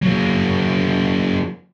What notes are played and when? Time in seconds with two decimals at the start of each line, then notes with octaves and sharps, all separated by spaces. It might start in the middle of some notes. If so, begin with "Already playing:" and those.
0.02 F#3 A#3